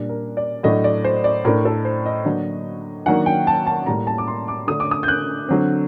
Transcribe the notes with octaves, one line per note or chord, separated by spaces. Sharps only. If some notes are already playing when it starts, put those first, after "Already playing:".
Already playing: A#2 G3 D4
A#4
D5
A2 F#3 A3 D4 D#5
D5
C5
D5
A2 A3 D4 A#4
A4
C5
D#5
D3 F#3 A#3 D4
D#3 F#3 A#3 D4 F#5
G5
A5
A5
A2 G3 A#3 A#5
A5
D6
C6
D6
D3 A3 D4 D#6
D6
D#6
G6
F#6
D3 F#3 C4